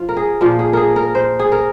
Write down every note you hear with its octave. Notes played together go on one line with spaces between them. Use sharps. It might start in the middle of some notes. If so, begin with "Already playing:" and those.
Already playing: F3 F4
A#4
G#4
A#2 F3 F4
G#4
G#4 A#4
A#4
C5
G#4
A#4